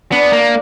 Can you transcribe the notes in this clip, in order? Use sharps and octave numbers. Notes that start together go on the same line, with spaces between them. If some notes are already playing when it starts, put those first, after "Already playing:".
B3 D4
A#3